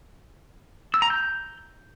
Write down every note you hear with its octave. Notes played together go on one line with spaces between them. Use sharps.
E6
A#5
G6